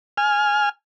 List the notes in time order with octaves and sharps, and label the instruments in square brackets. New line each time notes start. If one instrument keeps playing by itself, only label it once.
[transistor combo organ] G#5 F6